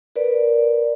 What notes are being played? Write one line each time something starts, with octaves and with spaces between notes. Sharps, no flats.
A#4 B4 D5